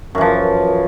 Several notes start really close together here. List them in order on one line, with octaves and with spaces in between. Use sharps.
F#2 E3 F3